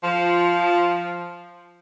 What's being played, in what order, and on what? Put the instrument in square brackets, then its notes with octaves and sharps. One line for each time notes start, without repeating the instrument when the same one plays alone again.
[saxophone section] F3